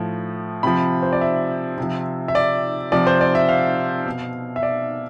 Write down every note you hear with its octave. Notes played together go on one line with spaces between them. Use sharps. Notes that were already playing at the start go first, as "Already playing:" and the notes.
Already playing: A2 F3
C3 F3 B5
C5
D5
E5
C3
F3
E5
D5
C3 F3 D5
C5
D5
E5
F5
B2
E5
D5